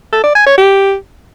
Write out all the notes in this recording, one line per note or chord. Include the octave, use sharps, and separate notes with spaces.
A4
D5
G#5
C#5
G4